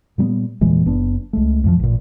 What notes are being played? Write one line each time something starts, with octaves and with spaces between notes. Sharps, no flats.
A#2 G3 A#3 B3
E2 A#2 E3 G#3
F#1 B3 D4
C#2 G#3 A3
F2 A2 E3 F3
A1 A#2